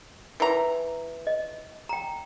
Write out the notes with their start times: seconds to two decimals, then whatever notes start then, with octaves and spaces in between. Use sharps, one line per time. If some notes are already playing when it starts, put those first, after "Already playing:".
0.40 E3 A#5
1.27 D#5
1.89 G5 A#5